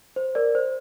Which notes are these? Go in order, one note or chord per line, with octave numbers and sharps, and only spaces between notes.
C5
A#4 D5
C5